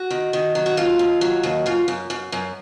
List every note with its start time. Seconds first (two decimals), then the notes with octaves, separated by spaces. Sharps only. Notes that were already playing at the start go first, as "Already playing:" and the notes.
Already playing: F#4
0.10 D#3
0.33 D#3
0.55 F#3
0.66 F#4
0.77 D#2 F4
0.99 D#2
1.21 F#3
1.43 D#2
1.66 F#2 F4
1.88 F#2
2.10 F#2
2.32 F#2